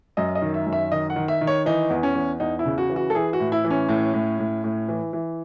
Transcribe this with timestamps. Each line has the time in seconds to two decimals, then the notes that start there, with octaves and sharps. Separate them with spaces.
0.17 F#2 D#5
0.35 D#5
0.42 D#3
0.54 E5
0.66 F#2
0.73 E5
0.91 D#3 D#5
1.10 F#5
1.16 D#3
1.28 E5
1.41 D#3
1.47 C#5
1.66 E3 D#4
1.90 E2
2.03 C#4
2.15 E2
2.40 E2 D#4
2.59 E4
2.65 C#3
2.78 F#4
2.90 E3
2.96 F#4
3.10 A4
3.15 E3 G#4
3.33 F#4
3.40 A2
3.52 E4
3.64 E3
3.70 C#4
3.89 A2
4.14 A2
4.39 A2
4.64 A2
4.89 E3
5.13 E3